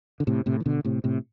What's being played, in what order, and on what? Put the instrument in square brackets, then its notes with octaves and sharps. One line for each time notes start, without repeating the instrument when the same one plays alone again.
[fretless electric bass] D3
A2 C3
A2 C3
E3
B2 D3
A2 C3
A2 C3